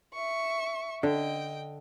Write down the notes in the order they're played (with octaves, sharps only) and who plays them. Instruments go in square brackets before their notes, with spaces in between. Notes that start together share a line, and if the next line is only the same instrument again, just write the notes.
[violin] E5 C#6
[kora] D3 [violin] D#5 G5